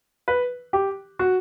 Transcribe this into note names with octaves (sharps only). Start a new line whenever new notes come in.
B4
G4
F#4